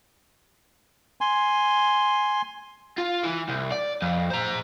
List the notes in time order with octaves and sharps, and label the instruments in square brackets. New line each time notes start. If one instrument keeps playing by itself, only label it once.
[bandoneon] G#5 C6
[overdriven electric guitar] F4
E3
C2
D5
F2
C5 A#5